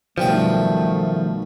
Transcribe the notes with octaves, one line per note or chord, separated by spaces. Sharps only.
B1 D#3 F3 G3 A3 G5